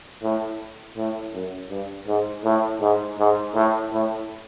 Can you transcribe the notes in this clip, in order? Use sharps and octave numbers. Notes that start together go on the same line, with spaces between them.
A2
A2
F#2
G2
G#2
A2
G#2
G#2
A2
A2